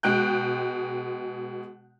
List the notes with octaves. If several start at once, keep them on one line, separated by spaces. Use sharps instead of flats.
B2 G#3 G5 F#6 G6